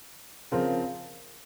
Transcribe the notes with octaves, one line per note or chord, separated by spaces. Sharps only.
C#3 F3 C4 F4 A#4